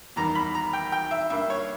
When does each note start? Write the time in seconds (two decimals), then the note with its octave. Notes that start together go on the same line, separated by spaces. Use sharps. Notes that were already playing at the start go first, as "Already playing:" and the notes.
0.16 E2 D#3 G3 A#5
0.35 B5
0.55 A#5
0.73 G5
0.92 G5
1.11 E5
1.30 G2 G3 A#3 E5
1.50 C#5